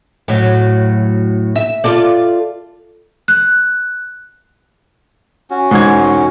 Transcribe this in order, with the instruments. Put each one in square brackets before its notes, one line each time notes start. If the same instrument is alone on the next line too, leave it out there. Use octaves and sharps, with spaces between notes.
[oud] A2 F#3
E5
F4 A4 D5
[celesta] F#6
[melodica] C#4 F#4
[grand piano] E1 D#4 G#6 [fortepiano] G#2